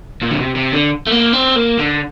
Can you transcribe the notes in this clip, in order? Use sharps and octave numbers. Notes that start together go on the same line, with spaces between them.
A#2
D3
C3
C3
D3
A3
A#3
C4
A#3
D3